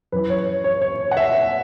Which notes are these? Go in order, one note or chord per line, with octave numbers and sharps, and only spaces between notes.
F#2 E3 B4
C#5
C#5
C#5
F#5
E5